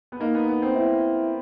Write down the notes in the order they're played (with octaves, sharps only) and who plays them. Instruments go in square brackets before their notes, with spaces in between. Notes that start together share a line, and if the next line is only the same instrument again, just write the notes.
[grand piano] B3
[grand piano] A#3 [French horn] D#4
[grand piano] B3
B3
C4
[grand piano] C4 [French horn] E4